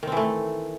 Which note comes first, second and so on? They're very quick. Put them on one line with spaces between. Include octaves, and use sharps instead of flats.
D#3 C4 E3 A3